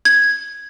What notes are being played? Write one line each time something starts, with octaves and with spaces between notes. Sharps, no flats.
G#6